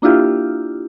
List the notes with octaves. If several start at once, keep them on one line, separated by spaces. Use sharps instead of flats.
A#3 D4 E4 F4 G4